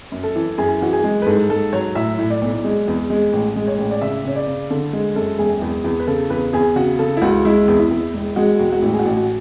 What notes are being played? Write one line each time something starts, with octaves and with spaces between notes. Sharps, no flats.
F#2
A4
E3
F#2 G#4
E3 F#4
G#4
G#3
B4
G#2 A4
G#2 A4
F#3 C#5
A2 E5
A2
D5
B1
G#3
E2
G#3
A1
G#3
C#5
A1
D5
C#3 E5
C#3 C#5
D5
C#3
D3 A4
G#3
F#2 A4
E1 G#4
E2
E2
B4
C#3 A4
E2 B4
E2 G#4
C#3 F#4
C#3 A4
E4
C#2 F#4
G#3 E4
E2
E4
E2
E1
G#3 F#4
E1 F#4
F#4
A1 E4
G#4
F#4
A1
F#4